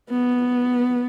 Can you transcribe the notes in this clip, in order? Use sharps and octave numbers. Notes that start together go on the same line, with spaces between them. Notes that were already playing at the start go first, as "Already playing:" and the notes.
B3